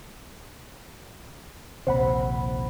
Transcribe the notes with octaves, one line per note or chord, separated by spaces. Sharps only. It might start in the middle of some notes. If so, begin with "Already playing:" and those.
A#1 D#2 C3 C5 F#5 B5